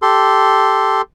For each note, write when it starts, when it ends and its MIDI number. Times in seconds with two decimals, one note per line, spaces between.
0.02 1.02 67
0.02 1.02 69
0.02 1.02 84